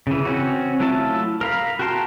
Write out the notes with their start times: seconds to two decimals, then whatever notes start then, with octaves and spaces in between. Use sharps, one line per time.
0.07 C#3 E3
0.25 C4 C#4 F#4
0.80 F#3 A3 E4 F4 A5
1.41 A#4 F5 B5
1.79 F#4 G4 A#4 A5 C6